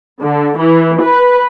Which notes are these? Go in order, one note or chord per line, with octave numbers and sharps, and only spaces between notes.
D3
E3
B4